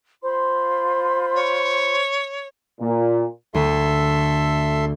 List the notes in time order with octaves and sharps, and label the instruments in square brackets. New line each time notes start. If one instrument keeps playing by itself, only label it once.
[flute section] F4 B5 C6 [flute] C5
[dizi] C#5
[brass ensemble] A#2
[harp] D2 [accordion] A4 E5 C6